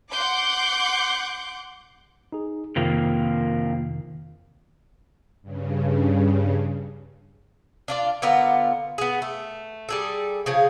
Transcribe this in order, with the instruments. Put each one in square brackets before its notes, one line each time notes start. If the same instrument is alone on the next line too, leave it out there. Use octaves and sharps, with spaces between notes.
[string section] F#5 C6 D6 G6
[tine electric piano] D#4 G#4
[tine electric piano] F2 C3 D#3 [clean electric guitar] F3 A#3 C4
[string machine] G2 C#3
[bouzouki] D4 F4 D5
D3 B3 F4 A#4
B3 G#4
A3
G3 G#4 A4
C#3 F3 G#4